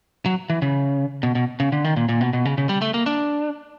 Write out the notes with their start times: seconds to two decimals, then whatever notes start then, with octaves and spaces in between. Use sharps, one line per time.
0.26 F#3
0.50 E3
0.62 C#3
1.23 B2
1.35 B2
1.60 C#3
1.72 D3
1.84 D#3
1.97 A#2
2.09 A#2
2.21 B2
2.33 B2
2.45 C#3
2.58 C#3
2.69 G3
2.82 A3
2.94 A#3
3.06 D4